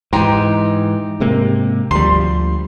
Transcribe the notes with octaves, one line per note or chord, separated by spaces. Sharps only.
G#2 E3 D#4 G4 C6
G#2 C3 A#3
D2 F3 G3 C6